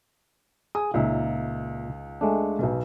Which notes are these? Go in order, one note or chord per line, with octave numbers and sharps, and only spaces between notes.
G#4 D#6
C#2 A#2 D#4 E5
G#3 A3 D4
B1 B2